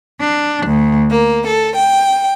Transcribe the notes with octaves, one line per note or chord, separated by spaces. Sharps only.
D4
D2
A#3
A4
G5